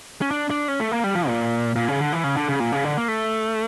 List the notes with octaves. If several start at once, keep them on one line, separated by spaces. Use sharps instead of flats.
C#4
D4
D4
C#4
A3
A#3
G3
F3
A#2
A#2
C#3
D3
E3
C#3
D3
C#3
A#2
C#3
D3
A#3
A3